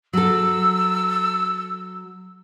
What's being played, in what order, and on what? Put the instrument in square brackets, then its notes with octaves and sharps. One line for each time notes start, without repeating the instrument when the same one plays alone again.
[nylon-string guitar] F#3 A4 [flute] E6